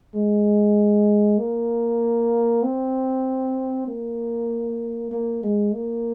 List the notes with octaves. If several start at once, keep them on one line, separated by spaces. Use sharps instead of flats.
G#3
A#3
C4
A#3
A#3
G#3
A#3